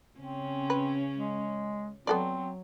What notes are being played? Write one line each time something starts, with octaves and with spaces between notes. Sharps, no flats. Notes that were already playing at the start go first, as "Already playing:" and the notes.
C#3 C4 C#4
B4
G#3
F#3 B3 C4 A4 D5